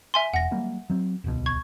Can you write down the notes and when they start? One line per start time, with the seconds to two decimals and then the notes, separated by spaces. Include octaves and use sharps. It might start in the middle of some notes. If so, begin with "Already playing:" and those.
0.14 E5 G#5 C6
0.34 E1 F#5 A#6
0.51 F#3 G3 A#3
0.90 F#3 C4
1.24 D1 C2 B2
1.46 C#6 G#6